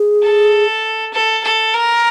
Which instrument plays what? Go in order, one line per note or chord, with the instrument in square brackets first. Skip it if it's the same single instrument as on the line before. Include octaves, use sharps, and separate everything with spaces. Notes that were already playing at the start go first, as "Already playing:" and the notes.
Already playing: [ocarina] G#4
[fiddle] A4
A4
A4
A#4